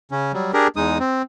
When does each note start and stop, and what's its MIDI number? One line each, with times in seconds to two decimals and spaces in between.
0.12 0.32 49
0.12 0.32 61
0.33 0.52 54
0.33 0.52 55
0.54 0.67 62
0.54 0.67 67
0.54 0.67 68
0.54 0.67 70
0.76 0.98 40
0.76 0.98 56
0.76 0.98 63
0.76 0.98 87
1.00 1.22 60